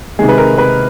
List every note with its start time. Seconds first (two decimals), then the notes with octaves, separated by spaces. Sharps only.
0.19 C3 D#3 G#3 G#4
0.29 B4
0.38 A#4
0.58 B4